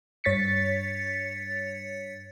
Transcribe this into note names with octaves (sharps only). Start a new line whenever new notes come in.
G2 C#5 A6 B6 C#7